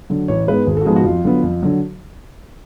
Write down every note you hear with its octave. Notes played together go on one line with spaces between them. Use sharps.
D3 F#3
A1 C#5
G#2 G#3 B3 B4
G#1 G#4
A4
F#4
G#2 F3 G#3 B3 G#4
F#4
F2 F4
D3 F#3 B3
F2
D3 F#3